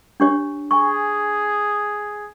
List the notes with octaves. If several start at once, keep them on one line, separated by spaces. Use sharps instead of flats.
D4 G4 C#5
G#4 G#5 C#6